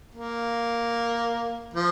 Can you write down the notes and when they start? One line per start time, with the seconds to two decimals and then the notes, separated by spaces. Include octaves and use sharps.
0.14 A#3
1.74 F3